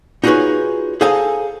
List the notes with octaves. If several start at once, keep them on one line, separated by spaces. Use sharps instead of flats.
D#4 F4 F#4 G#4 B4 C#5
G#4 A4 C5 F5 G#5 A#5